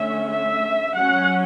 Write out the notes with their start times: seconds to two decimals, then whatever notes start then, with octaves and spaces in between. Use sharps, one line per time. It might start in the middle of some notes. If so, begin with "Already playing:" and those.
Already playing: D3 A3 C#4 E5
0.31 E5
0.96 F#3 C#4 F#5